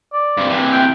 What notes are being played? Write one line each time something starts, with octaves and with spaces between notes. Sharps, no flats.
D5
G2 C3
C3 E3
G5